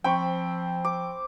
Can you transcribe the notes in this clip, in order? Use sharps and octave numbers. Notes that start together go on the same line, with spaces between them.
F3 C4 G5 B5 C#6
D6